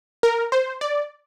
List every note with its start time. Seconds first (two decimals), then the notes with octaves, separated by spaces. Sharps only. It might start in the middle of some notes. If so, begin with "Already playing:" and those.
0.23 A#4
0.52 C5
0.81 D5